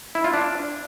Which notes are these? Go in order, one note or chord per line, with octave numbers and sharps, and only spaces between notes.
E4
F4
D4